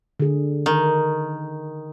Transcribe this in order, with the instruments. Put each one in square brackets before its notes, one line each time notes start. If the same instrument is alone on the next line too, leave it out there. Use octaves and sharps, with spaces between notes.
[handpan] D3 G#4
[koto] D#3